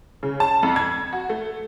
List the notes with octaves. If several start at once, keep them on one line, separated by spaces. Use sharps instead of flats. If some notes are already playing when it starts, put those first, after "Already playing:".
C#3
A5
F2
G#6
F#4
A3